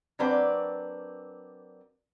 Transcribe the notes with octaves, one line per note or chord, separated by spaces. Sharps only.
F#3 A#3 C4 D4 B4 D5